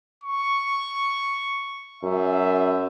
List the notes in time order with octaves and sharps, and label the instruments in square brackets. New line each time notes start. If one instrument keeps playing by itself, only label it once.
[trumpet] C#6
[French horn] F#2 [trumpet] E5